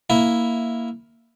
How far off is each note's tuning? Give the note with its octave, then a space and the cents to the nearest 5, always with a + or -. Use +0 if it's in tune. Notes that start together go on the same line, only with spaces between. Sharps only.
A#3 +0 E4 +0